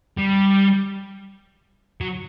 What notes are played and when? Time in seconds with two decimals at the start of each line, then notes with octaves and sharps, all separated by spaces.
0.17 G3
2.01 F#3